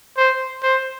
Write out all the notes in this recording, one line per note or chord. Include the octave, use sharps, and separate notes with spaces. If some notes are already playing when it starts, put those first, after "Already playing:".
C5
C5